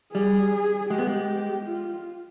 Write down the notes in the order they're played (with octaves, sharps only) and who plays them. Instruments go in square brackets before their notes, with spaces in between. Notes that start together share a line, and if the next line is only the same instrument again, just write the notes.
[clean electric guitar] G3 [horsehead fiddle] G#4
[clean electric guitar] G#3 [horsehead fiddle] G4
[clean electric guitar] B3
G#3
[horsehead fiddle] F4